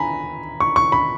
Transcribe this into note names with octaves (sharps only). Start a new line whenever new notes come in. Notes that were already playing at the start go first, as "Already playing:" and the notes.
Already playing: G#5 A#5 B5
C#6
C#6
B5